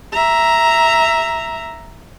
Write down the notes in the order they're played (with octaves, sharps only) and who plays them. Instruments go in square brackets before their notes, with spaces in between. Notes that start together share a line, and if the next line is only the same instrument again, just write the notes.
[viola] E5 A#5